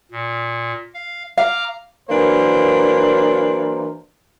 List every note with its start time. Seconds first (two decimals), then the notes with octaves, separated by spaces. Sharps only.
0.11 A#2
0.94 F5
1.38 F5 A#5 D6 F6
2.09 E3 F#3 A#3 D4 A#4 C5